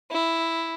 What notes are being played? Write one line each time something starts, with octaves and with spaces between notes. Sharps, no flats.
E4